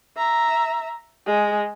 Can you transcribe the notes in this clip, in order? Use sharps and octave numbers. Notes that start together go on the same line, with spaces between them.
E5 A#5
G#3